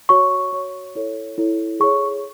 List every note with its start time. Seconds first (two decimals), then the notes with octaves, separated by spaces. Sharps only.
0.09 F#4 C#5 C#6
0.53 F#4 C#5
0.95 E4 A4 C#5
1.38 E4 A4 C#5
1.80 G#4 C#5 C#6